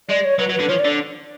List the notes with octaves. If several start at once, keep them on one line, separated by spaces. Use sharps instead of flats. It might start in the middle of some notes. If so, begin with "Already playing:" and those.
G#3 D5
C#5
F#3 B4
F#3
B4
D3
F3 C#5
D5
D3